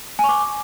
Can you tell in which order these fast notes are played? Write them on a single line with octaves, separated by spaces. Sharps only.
G#5 C#6 D6